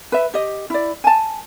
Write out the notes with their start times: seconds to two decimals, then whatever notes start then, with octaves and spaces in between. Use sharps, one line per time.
0.12 B4 E5
0.34 G4 D#5
0.70 E4 D5
1.04 G#5 A5